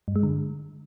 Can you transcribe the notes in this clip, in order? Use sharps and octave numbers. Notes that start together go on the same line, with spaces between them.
G2
G#3
D3